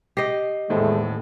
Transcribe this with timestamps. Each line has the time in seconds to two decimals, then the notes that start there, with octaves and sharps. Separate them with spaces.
0.17 G4 D#5 C7
0.70 D#1 E2 A2 G#3 A3 C5